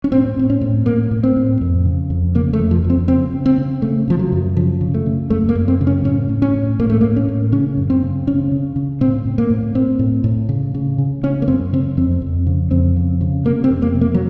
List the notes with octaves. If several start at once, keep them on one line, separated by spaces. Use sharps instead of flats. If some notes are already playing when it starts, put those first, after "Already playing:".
C#4
A2 C4
A2 C4
C#4
A2
A2 A#3
A2
C4
A2
F2
C#3
F2
C#3 A#3
A3
F2
F3
F2
C4
C#3 C4
C#3
C4
C#3
C#3 A3
C#3 F3
F#3
F#2
C#3 F3
C#3
A3
C#3
F#2 A3
A#3
F#2
C4
C#3
C#4
A2 C#4
A2
C#4
A2
A2 A#3
A3
A#3
A2
C#4
A2
C#3 C#4
F#2
C4
C#3
C#3 C#4
C#3
C#3
A2 C4
A2
A#3
A2
A2 C4
A2
A2
C#3
C#3
C#3
C#3 C#4
A#3
F#2 C4
C#3 C4
F2 C4
F2
C#3
F2 C4
C#3
C#3
C3 A#3
C4
F2
A#3
C3
A#3
F#3